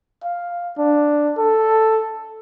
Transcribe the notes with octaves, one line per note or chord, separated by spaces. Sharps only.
F5
D4
A4